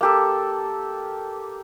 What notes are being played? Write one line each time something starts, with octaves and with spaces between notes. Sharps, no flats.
A#3 G4 A4